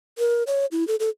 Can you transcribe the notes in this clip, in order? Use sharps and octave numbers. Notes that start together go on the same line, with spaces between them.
A#4
C#5
E4
A4
A4